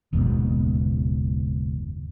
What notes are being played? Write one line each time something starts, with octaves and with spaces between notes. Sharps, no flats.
F#1 D#2 G#2 B2